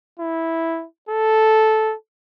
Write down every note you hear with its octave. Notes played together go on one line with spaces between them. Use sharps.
E4
A4